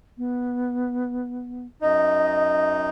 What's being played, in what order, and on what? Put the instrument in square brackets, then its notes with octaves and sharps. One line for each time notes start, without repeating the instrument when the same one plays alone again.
[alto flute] B3
[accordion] F#2 D#4 [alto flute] D#5